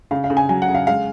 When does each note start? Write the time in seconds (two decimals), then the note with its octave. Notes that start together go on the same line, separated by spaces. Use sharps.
0.11 C#3 F5
0.24 F5
0.30 C#3
0.37 G#5
0.49 F#3 G#5
0.62 F#5
0.68 C#3
0.75 F5
0.87 G#3 F5